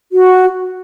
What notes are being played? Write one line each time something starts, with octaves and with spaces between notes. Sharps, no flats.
F#4